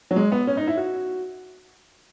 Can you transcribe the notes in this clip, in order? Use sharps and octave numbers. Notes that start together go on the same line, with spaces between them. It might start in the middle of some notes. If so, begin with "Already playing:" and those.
F#3
G#3
B3
C#4
D#4
E4
F#4